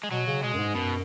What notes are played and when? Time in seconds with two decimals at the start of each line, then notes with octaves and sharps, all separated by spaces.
0.04 G#3
0.11 B2 F#3
0.27 C#3
0.43 B2 G#3
0.53 F#2
0.58 G#2
0.75 F#2 B2